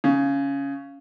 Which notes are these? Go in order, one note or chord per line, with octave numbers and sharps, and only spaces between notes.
C#3